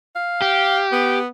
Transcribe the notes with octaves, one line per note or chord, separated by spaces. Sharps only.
F5
G4
B3